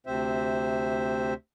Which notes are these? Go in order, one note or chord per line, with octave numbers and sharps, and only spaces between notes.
D2 C3 C4 C5 E5